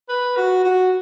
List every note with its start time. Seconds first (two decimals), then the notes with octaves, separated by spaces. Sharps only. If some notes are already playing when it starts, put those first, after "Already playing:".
0.09 B4
0.36 F#4
0.64 F#4